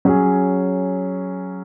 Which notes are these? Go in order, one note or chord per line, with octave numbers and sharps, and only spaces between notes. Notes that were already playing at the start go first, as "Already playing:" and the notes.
F#3 C#4 G#4